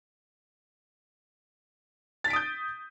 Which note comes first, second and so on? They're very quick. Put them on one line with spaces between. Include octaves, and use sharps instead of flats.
A6 B6 D7 D#6 G6